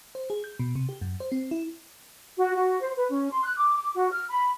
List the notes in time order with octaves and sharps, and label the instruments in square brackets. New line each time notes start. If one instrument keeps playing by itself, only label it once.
[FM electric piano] C5
G#4
G6
B2
C3
G4
F#2
C5
C4
E4
[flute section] F#4
F#4
C5
B4
C#4
C6
F#6
D6
D6
F#4
F6
B5